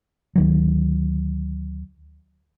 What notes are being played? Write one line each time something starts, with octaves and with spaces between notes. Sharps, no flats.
D2 D#3 F#3